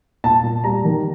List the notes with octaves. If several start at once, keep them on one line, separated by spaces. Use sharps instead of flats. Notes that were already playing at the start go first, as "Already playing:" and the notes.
A#2 A5
A#2
G3 A#5
D#3